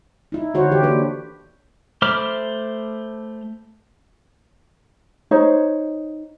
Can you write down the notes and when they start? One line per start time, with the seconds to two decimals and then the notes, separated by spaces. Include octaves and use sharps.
0.32 D#4 E4
0.54 D3 F#4 C5 C#5
0.70 E3 G4
0.83 A#3 D4 B4 C5
2.02 A3 C5 B5 D6 F6
5.31 D#4 C5 C#5